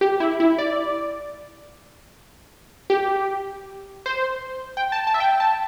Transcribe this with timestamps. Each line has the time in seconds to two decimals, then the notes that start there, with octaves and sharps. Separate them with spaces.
0.01 G4
0.20 E4
0.40 E4
0.58 D5
2.90 G4
4.06 C5
4.77 G5
4.92 A5
5.07 A5
5.14 E5
5.20 G5
5.40 A5